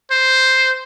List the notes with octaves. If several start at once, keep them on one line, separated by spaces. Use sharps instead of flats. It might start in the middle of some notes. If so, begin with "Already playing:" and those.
C5